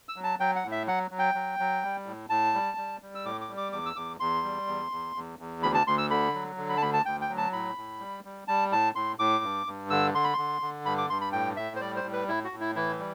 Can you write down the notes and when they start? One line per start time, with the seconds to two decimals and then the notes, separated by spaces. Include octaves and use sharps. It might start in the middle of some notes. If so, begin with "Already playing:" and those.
0.09 E6
0.16 F#3
0.24 A5
0.40 F#3 G5
0.56 F#5
0.64 A2
0.72 E5
0.87 F#3 F#5
1.11 F#3
1.19 G5
1.35 F#3
1.59 F#3
1.83 G3
2.06 A2
2.30 A2 A5
2.54 G3
2.77 G3
3.02 G3
3.15 E6
3.25 A2 D6
3.41 D6
3.49 G3
3.57 D6
3.72 E2 D6
3.86 E6
3.96 E2 D6
4.20 E2 C6
4.43 G3
4.67 E2
4.91 E2
5.16 E2
5.39 E2
5.63 D2 B5
5.74 A5
5.87 D2 C6
5.98 E6
6.10 D3 B5
6.34 F#3
6.57 D3
6.69 B5
6.77 A5
6.81 D2 B5
6.93 A5
7.05 D2 G5
7.21 G5
7.29 F#3
7.37 A5
7.52 A2 B5
7.77 A2
8.00 G3
8.24 G3
8.48 G3 A5
8.72 A2 A5
8.95 A2 C6
9.19 A2 D6
9.44 G2
9.66 G2
9.90 D3 E6
10.14 D3 C6
10.24 B5
10.34 D3 C6
10.62 D3
10.85 G2 B5
10.98 D6
11.10 G2 C6
11.21 B5
11.32 A2 G5
11.56 A2 E5
11.76 C5
11.80 G3 D5
11.96 C5
12.04 A2
12.13 B4
12.28 A2 E4
12.44 F#4
12.52 A2
12.60 E4
12.75 E3 E4
12.99 G3